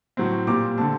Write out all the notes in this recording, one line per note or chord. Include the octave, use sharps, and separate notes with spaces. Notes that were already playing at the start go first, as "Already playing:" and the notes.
A2 F#3 C4
A#2 G3 C4 A#5 D6
D3 A3 C4 A5 C6